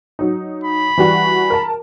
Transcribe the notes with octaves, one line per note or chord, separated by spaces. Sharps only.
F#3 D#4
B5
E3 G3 F#4
A#4 A5